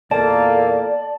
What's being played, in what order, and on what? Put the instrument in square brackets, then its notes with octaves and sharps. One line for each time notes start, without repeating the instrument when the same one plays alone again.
[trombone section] E2 A#2 A#3 [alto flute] A4 [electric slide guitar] D5 [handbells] A5